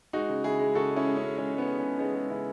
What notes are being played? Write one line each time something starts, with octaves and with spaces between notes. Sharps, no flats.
G#3 D#4 F#4
C#3
C#3 E4 G#4
G#3
C#3 F#4 A4
G#3
C#4 E4
G#3
G#3 C#4
G#3 C#4
G#3
B3
G#3
C#3 C#4
G#3 B3 D#4
G#3
C#3 C#4 E4